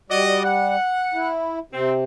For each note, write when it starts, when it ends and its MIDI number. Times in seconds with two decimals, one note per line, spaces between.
0.10 0.76 55
0.10 0.41 66
0.10 0.41 74
0.10 0.41 75
0.44 1.29 78
1.14 1.59 64
1.73 2.04 48
1.73 1.92 60